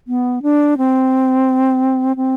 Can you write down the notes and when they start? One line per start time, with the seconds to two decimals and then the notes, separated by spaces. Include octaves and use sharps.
0.08 B3
0.42 D4
0.78 C4
2.16 C4